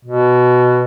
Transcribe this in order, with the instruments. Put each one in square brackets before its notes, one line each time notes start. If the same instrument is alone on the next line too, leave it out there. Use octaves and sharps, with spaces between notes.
[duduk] B2